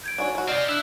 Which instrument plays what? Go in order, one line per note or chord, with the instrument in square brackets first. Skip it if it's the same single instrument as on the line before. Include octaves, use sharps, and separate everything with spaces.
[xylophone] G6 G#6 D7
[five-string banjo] D4 F#4 C#5 [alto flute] G#5
[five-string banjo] F#3 F#4
[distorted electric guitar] C4 G4 [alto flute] D5 [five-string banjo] D#5 [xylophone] F6
[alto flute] D4 [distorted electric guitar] E4 [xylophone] E6 F#6